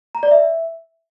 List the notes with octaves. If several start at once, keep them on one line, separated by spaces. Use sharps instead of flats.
A#5
D5
E5